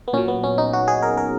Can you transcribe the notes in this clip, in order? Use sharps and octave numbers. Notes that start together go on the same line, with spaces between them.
B3
A#2 F#3 C#4
B3
C#4
D#4
F#4
G#4
A#4
A#4